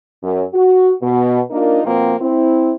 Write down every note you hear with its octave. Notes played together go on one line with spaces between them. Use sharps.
F#2
F#4
B2
A#3 D4 D#4 F4 A#4
B2 F3 A#3 C4
C4 E4